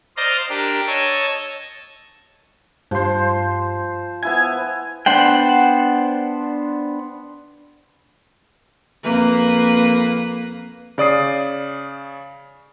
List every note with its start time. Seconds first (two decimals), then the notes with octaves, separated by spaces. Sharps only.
0.17 C5 D5 D#5 F5 A#5 C6
0.49 D4 G4 A#4
0.87 C#5 D#5 A5 E6 G#6
2.91 G2 F3 C5 C6
4.23 B3 E4 G#5 G#6
5.06 B3 D4 C5 F#5 G5
9.03 F2 A#3 B4
10.98 C#3 D5 D#6 C7